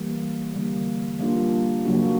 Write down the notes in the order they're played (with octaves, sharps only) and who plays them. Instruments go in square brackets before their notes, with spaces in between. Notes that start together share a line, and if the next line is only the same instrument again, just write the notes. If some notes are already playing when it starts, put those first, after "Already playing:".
Already playing: [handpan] E3 G3 A#3
D3 G3 A#3
G3 A#3 D4 F4
C#3 F#3 A#3 D4 F#4